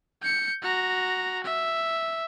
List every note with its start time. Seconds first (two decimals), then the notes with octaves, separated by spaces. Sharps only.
0.22 G6 C#7
0.62 F#4 A#5
1.44 E5